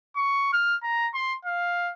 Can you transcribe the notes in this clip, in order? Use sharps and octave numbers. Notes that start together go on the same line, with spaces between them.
C#6
F6
A#5
C6
F5